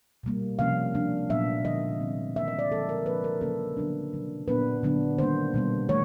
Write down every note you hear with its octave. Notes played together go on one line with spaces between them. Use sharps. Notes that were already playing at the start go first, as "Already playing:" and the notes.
B2 G3 A#3
C3 F3 A#3 C#4 F5
F3 A#3 D4
A#2 F#3 B3 D4 E5
D3 F3 G#3 D#5
D3 G3 C4
D#3 F#3 A#3 E5
D#5
D5
D3 F3 G#3 C4 A4
A#4
A#2 F3 A#3 D4 B4
A#4
C#3 F#3 A#3 C#4 A4
D3 F#3 B3 D4
B2 F#3 A#3
A#2 F#3 B3 D4 B4
D3 F#3 B3 D4
D#3 G3 A#3 D4 C5
B2 G3 B3
E3 A3 C#5